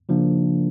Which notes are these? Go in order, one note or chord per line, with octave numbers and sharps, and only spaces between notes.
C#3 F3 A#3 D4